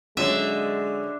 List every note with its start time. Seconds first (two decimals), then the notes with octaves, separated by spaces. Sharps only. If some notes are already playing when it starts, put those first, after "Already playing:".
0.17 D3 F#3 G#3 C#4 E5